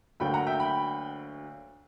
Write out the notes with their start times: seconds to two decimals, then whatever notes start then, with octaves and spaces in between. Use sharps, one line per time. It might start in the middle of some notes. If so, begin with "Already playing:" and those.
0.20 D2 D3 F#3 A#3 G5 B5
0.34 F#5 A#5
0.47 E5 G5
0.59 G5 B5